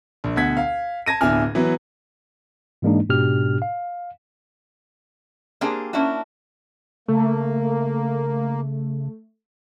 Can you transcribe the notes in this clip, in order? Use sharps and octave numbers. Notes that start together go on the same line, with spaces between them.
A#1
D2 B2 F#5 G#6 B6
F5
A5 G#6 A#6 D#7
D1 B2 D4 E4 G#5 F6
E3 F#3 B3
G#2 E3 G#3 A#3 D4 D#4
G#2 B2 D4 G4 F6
F5
A#3 C4 D4 G4 G#4 F5
A#3 C#4 D4 E4 F#4
C#3 A3 A#3